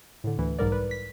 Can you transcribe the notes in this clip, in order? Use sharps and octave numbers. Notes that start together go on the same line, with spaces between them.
A2 D3
D2 E3
B1 G#2 G3 A#4 D5
B4
B6